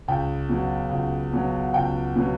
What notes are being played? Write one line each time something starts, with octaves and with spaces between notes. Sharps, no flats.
C#2 G5
B2 F#3
C#2
B2 F#3
C#2 G5
B2 F#3